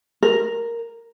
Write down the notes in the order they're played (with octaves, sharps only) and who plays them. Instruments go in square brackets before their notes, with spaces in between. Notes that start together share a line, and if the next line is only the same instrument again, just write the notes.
[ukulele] A#4